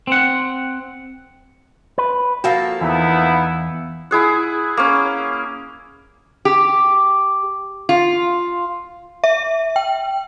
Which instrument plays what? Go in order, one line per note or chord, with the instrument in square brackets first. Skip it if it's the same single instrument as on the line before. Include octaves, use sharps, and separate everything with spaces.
[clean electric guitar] C4 F#5
B4
[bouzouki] F3 A#3 A4 [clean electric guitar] F#4
[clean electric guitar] E2 [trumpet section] B3 D#4 E4
[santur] E4 G#4 F#5
A#3 C#4
[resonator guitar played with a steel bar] G4
F4
[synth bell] E5
G5